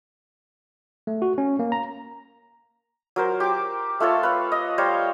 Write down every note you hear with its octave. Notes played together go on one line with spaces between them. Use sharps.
A3
F#4
C#4
A#3
A#5
F#3 A#4 C5
G4 D6
A3 F4 A4 C#5
B4 F5
D#5
G3 C5 C#5 F5